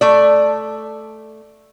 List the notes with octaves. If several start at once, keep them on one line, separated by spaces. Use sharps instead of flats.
A3 D5